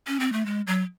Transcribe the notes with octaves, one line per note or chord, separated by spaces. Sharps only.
C#4
C4
A3
G#3
F#3